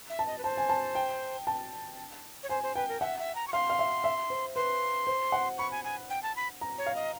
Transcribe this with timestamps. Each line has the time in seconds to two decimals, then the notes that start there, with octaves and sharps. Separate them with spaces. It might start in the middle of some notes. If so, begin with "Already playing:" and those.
0.10 E5
0.19 A5
0.27 D#5
0.38 B4
0.44 C5 A5
0.57 G#5
0.69 A5
0.95 G5
1.47 A5
2.43 C#5
2.49 C5 G#5
2.63 C5
2.76 B4 G5
2.88 A#4
3.01 E5 F#5
3.19 E5
3.35 A#5
3.48 C#6
3.53 F5 C6
3.70 F5
3.79 E5
4.04 E5
4.30 C5
4.55 B4 C6
5.07 C5
5.32 F#5
5.58 B5 C#6
5.71 G#5
5.84 G#5
6.10 G5
6.23 A5
6.36 B5
6.61 A#5
6.78 C#5
6.86 F5
6.95 D#5